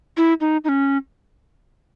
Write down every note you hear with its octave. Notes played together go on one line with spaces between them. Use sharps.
E4
D#4
D#4
C#4